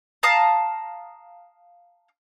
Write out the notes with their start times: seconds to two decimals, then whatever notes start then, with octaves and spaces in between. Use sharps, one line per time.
0.23 F5 A5 A#5 D#6